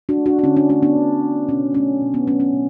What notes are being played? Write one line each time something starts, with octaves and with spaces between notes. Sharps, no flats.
D4 F#4
A3
D4 F#4
F#4
D3 C#4 E4
D4 F#4
A3 D4 F#4
B3 D4
D3
A3
B2 C#4
F#3 A3 C#4
B2
B3
F#3 A3 C#4
C#4
B2